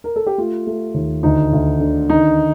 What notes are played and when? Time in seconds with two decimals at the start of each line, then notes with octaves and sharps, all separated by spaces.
0.04 A#4
0.16 A4
0.26 G4
0.38 A3 F4
0.67 A3
0.94 D#2
1.23 D2 D#4
1.53 D2
1.80 D3
2.10 D#3 D#4